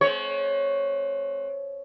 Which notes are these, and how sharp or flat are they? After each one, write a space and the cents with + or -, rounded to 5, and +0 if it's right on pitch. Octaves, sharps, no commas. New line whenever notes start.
G#3 +45 C4 +0 C#5 +0